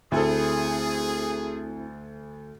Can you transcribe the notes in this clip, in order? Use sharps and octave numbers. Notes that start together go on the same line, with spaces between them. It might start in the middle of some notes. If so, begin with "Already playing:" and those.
D2 C4 E4 G#4 A4